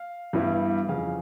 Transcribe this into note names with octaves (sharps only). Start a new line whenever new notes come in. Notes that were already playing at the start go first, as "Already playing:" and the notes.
Already playing: F5
G2 E3 G3 B3 E4
F2 C#3 E3 F5